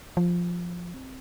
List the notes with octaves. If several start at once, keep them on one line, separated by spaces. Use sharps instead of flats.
F3
C4